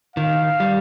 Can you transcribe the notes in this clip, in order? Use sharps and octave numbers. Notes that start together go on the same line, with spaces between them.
D#3 F5
G3